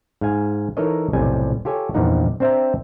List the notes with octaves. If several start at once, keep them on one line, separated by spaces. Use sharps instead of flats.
G#2 F5 G#5
E3 D#4 A4 A#4 C#5 D#5
B1 F2 A2 C3 G3 G#5
F4 G4 A4 C#5 G#5
E2 G2 A#2 F3 D#4 F#5
C4 D4 C5 E5 G5 A#5